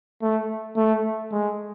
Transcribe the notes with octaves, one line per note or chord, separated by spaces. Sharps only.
A3
A3
G#3